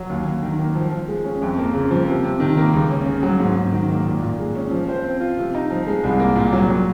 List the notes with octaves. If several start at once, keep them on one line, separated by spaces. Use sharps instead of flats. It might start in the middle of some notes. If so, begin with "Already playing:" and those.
Already playing: F#3
D#2
D#2
D#3
A#3
F3
F3
G#3
C#4
F2
A#3
C#3
F3
C3
C3
D#3
A#3
C#2
C#4
C#3
F#3
G#2
G#2
D#3
A#3
A#2
A#2
G#3
C#4
F3
C5
C4
F4
C3
D#4
F3
G#3
C2
A#3
A#2
F#3
F#3